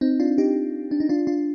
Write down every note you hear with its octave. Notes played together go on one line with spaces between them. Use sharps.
C4 D#4
D4 F4
D#4 G4
D4
D#4
D4 F4
D4 F4